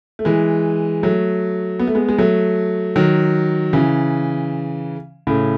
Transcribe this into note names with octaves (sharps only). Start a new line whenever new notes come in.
A3
E3 G#3
F#3 A3
B3
A3
G#3 B3
G#3
F#3 A3
D#3 F#3
C#3 E3
A2 C#3